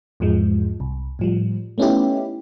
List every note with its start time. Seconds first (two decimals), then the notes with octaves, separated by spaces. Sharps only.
0.20 E2 G#2 F3 G#3
0.80 C2
1.19 A2 F3 G3
1.78 A3 B3 C#4 D#4 E4 G4